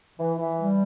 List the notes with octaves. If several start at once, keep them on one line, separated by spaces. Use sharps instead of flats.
E3
E3
G3